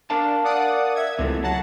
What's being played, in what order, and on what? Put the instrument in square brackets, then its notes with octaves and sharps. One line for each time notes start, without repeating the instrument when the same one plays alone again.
[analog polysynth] D4 [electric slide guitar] A#4 F5 A5
[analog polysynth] D5 F#5 D#6
E5 G#6
[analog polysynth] C#2 [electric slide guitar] C3 E3 A3
[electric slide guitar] F#3 [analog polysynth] F#5 A5